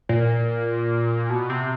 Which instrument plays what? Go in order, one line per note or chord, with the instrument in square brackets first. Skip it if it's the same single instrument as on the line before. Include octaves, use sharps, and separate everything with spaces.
[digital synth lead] A#2
B2
C3